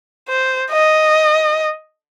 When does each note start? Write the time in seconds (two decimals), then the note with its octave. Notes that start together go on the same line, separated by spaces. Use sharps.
0.29 C5
0.72 D#5